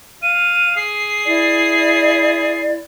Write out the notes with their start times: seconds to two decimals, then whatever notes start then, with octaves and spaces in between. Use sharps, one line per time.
0.22 F5 D#7
0.76 G#4 C7
1.27 E4 D5